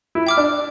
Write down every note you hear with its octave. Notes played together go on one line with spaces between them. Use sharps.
E4
G5 D6 F6
D4